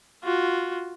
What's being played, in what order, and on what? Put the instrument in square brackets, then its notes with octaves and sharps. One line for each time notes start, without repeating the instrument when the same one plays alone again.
[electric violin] F4 F#4